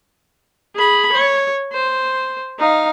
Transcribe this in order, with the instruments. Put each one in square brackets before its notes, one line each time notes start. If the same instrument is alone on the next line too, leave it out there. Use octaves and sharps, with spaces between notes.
[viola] G#4 B5
C#5
C5
D#4 F5